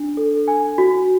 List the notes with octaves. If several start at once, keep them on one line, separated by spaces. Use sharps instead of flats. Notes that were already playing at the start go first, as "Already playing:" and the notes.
Already playing: D4
A4
G#5
F#4